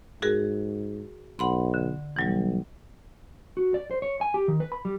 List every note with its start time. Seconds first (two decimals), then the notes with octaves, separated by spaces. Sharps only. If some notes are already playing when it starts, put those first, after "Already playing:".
0.22 G#2 F#4 G#4 A#4
1.39 B1 F#5 B5 C6
1.74 D3
2.16 B1 E3 F#3 G3
3.57 F#4
3.74 D5
3.91 C5
4.02 C#5
4.21 G#5
4.34 G4
4.48 D#3
4.60 B4
4.72 B5
4.85 G3